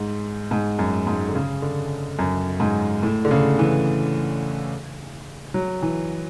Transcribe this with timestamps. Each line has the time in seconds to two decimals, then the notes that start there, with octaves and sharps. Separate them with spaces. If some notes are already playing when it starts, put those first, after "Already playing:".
Already playing: G#2
0.51 G#2
0.79 F#2
1.07 G#2
1.29 D3
1.35 C#3
1.62 D3
2.19 F#2
2.60 G#2
3.03 A2
3.25 D3
3.31 C#3
3.59 E3
5.54 F#3
5.82 E3